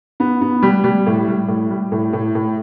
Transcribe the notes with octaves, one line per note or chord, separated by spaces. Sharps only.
B3
B3
G3
G3
A2
G3
A2
G3
A2
A2
A2